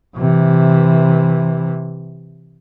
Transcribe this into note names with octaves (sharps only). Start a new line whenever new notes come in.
C3 E3